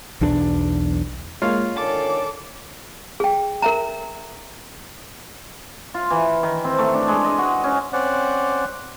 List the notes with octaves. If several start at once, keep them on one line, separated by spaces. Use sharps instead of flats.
B1 E2 D4
G#3 A#3 F4 C#5 F5
D3 D#3 C#4 A4 D6 A6
G#4 G5
A#4 E5 A#5
F4
E3
D#3
C4
A3
D4
G#3
D#5
F#4
C#4
C4 C#4 C5 D5 F#5